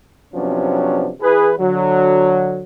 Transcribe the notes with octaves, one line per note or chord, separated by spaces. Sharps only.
C3 F3 F#3 B3 C#4 D4
E3 G#4 B4
D3 F#3